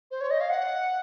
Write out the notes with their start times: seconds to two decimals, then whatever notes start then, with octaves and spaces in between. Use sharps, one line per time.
0.11 C5
0.21 C#5
0.31 D#5
0.41 F5
0.50 F#5